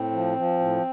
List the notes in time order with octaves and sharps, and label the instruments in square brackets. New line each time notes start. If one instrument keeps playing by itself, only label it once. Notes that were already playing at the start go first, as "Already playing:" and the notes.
Already playing: [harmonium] A2 C4
F3
F3
A2